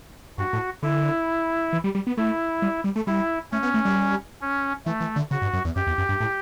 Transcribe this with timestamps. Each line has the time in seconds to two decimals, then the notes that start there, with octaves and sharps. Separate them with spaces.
0.38 G2 F#4
0.53 A2
0.83 D3 E4
1.73 E3
1.84 G3
1.95 G3
2.07 B3
2.17 A3 E4
2.62 G3
2.84 G3
2.96 A3
3.07 G3 E4
3.52 A3 C#4
3.63 B3
3.74 A3
3.85 G3
4.41 C#4
4.86 E3 A3
5.01 E3
5.16 D3
5.31 C#3 F#4
5.42 G2
5.53 F#2
5.65 E2
5.76 F#2 G4
5.87 E2
5.98 F#2
6.09 G2
6.20 A2